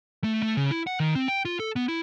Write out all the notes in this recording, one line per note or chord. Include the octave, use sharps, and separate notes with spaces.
A3
A3
C#3
E4
F#5
D#3
C4
G5
F4
A4
B3
E4